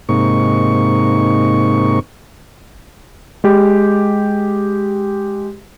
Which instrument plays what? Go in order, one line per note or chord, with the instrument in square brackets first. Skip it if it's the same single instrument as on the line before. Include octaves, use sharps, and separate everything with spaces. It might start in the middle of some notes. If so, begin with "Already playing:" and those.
[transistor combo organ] G#2 C3 A#3 D#4 C#6
[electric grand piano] G#3 G4